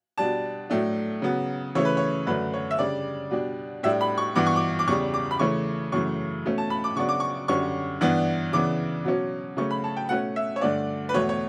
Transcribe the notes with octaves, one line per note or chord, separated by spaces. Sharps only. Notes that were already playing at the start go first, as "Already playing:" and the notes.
B2 G3 D4 A5
A2 F#3 A3 D4
C#3 F#3 B3
C#3 E3 A3 C#4 C#5
B4
C#5
F#2 D3 F#3 A3 D4 B4
C#5
E5
C#3 G3 D4 D5
B2 G3 D4
A2 G3 D4 E5
B5
C#6
G2 E3 B3 D6
C#6
D6
D6
E2 C#3 G3 C#6
D6
B5
C#3 E3 A3 C#4 C#6
F#2 C#3 E3 A3 C#6
B2 A3 C#4
A5
B5
D6
C#3 F#3 B3 D4 C#6
D6
C#6
F#2 D3 G3 C#4 C#6
G2 E3 B3 D4
C#3 E3 B3 D4 D6
B2 F#3 C#4
C#3 F#3 A3 C#4 C#6
B5
A5
G5
B2 A3 C#4 F#5
E5
C#5
G2 D3 A3 D4 D5
B4
E2 B2 A3 C#5
C#5